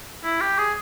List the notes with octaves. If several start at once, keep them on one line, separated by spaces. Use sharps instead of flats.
E4
G4
G#4